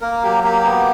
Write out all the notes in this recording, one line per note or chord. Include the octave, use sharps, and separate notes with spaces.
A#3 A#4
F#3 G4
A#3 G4
B3